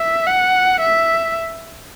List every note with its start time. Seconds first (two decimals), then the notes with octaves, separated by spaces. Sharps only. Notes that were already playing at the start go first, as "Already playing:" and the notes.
Already playing: E5
0.27 F#5
0.80 E5